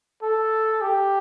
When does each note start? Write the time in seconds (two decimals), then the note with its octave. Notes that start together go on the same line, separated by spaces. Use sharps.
0.23 A4
0.81 G4